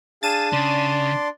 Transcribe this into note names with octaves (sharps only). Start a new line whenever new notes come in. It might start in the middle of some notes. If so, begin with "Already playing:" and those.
D4 G#4 F5 A6 D#7 E7
C#3 D5 C6